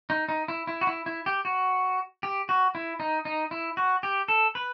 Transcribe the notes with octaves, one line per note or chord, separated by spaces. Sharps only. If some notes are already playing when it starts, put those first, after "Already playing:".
D#4
D#4
E4
E4
F#4
E4
E4
G4
F#4
G4
F#4
E4
D#4
D#4
E4
F#4
G4
A4
B4